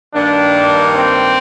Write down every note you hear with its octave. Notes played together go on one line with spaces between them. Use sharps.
G2 D#3 A#3 D4
C4